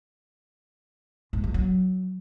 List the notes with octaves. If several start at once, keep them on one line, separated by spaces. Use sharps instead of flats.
G#2
F3
F#3